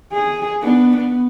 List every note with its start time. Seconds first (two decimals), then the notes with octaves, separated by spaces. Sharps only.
0.13 G#4
0.62 B3 D4
0.97 B3